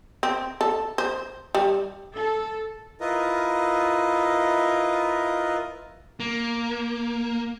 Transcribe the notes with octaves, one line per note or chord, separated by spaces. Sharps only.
C4
A4
C5
G3
A4
E4 F4 A#4 B4 D#5
A#3